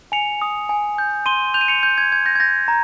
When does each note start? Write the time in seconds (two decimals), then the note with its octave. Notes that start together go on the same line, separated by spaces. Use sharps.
0.12 G#5 C#7 F7
0.42 D#6
0.69 G#5
0.98 G6
1.26 C6 D#7 G7
1.54 G6 F7
1.61 D#7
1.68 C#7 F7
1.83 G6
1.98 G#6
2.12 G6 G#6
2.26 G6 A#6
2.36 G#6
2.40 G6 A#6
2.68 A#5